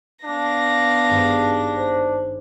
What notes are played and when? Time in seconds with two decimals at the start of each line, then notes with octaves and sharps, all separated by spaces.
0.24 B3 D4 F5 A#6
1.09 G#1 G2 G#3
1.69 C5 C#5